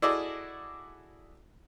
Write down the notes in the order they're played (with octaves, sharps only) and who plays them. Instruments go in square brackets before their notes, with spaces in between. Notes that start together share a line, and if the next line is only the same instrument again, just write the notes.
[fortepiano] E4 F#4 G#4 A4 D5 D#5